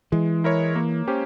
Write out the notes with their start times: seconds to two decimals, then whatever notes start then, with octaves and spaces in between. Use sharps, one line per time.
0.12 E3 G#3
0.44 E4 A#4 C#5
0.75 A#3
1.08 C#4 G4 C5